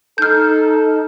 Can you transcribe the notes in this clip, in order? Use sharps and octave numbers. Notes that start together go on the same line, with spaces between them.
D#4 A4 F6 G6